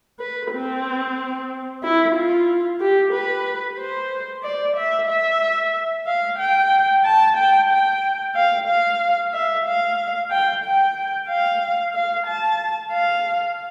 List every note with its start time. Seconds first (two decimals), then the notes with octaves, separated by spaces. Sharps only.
0.20 B4
0.52 C4
1.83 E4
2.15 F4
2.80 G4
3.13 B4
3.78 C5
4.43 D5
4.77 E5
5.09 E5
6.07 F5
6.39 G5
7.05 A5
7.37 G5
7.70 G5
8.35 F5
8.68 F5
9.33 E5
9.66 F5
10.31 G5
10.64 G5
11.28 F5
11.94 F5
12.26 A5
12.92 F5